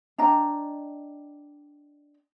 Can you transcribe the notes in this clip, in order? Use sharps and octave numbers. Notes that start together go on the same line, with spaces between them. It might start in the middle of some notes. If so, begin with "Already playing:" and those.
D4 D#5 G5 A#5